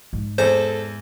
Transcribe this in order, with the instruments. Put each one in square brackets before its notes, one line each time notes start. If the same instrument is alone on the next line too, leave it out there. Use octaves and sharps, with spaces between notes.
[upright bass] G#2
[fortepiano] E2 [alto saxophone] A4 [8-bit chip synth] C5